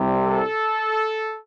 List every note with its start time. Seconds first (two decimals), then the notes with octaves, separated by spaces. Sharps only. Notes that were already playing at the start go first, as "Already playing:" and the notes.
Already playing: C2 C3 G3
0.27 A4